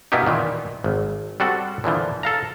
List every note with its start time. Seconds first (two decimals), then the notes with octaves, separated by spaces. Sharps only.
0.12 B2 A#3 B3 D#4 E4 G4
0.26 A#2 D#3 E3
0.84 G#1
1.40 G3 C4 F#4 A4 D5 F#5
1.84 A#2 D3 E3 F3
2.23 A4 F5 A#5